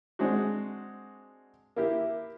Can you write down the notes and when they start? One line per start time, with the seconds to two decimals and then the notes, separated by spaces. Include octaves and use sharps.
0.19 G#3 C4 D4 F#4
1.76 A#3 E4 G4